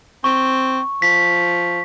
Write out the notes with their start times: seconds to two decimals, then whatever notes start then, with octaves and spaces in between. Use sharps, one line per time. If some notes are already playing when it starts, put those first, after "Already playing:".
0.24 C4 C#6
1.02 F3 B6